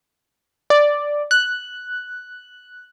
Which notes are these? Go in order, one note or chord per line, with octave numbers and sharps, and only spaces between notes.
D5
F#6